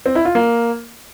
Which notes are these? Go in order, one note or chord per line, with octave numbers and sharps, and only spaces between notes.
C4
E4
F4
A#3